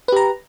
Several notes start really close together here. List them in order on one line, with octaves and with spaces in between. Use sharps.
B4 G4 A#5